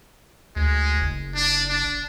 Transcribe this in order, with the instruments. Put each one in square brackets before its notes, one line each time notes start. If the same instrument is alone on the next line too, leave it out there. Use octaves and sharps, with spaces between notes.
[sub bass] D2 [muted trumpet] G#3
[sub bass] F#1
[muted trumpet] D4
D4